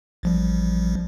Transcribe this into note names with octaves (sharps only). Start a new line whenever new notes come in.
A1 F3 G3